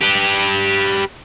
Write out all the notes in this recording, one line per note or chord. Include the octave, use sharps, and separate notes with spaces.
G4 B4